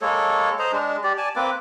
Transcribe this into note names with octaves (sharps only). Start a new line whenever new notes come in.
G#3 A#3 A4 C#5
C5 D#5 A#5
G#3 D4
G4 D5
D5 G#5 A5
A#3 C4 B4 D6